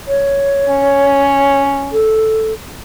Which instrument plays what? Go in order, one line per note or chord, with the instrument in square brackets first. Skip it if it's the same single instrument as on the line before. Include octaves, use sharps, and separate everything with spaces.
[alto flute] C#5
[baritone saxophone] C#4
[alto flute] A4